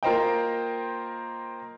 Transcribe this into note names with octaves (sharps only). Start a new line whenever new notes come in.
A#3 F4 A#4 C5 D#5 G5